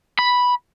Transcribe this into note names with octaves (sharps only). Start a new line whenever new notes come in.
B5